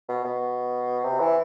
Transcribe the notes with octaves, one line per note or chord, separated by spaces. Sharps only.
B2
B2
C3
E3